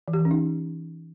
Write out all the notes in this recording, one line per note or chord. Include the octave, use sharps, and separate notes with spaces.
E3
G4
E3
C#4
D#4